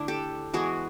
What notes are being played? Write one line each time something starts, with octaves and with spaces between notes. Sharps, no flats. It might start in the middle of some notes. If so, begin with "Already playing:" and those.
Already playing: D3 A3 D4 E4
G4 A4
E3 G#3 B3 F#4 G#4